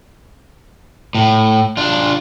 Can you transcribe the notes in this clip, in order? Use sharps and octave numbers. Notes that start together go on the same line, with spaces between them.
A2
D4 F4